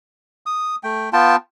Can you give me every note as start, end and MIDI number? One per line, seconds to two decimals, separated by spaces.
0.46 0.76 87
0.84 1.09 57
0.84 1.09 79
1.13 1.36 59
1.13 1.36 65
1.13 1.36 79
1.13 1.36 81